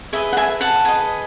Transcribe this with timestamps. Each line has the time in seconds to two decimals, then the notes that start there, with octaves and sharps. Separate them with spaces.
0.13 G#4 B4 D#5 E5
0.33 F#5
0.37 E5 G#5
0.61 F#5 A5
0.85 G#4 B4 D#5